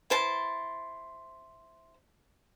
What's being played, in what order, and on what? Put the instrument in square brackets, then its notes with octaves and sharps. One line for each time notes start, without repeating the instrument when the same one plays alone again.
[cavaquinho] E4 C5 A5